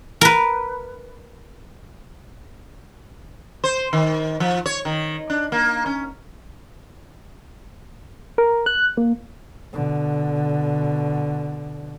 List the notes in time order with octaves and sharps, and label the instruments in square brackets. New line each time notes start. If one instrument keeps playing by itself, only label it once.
[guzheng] A#4 B4
[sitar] C5
D#3
F3
C#5
D#3
D4
A#3
C#4
[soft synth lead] A#4
F#6
A#3
[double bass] B2 D3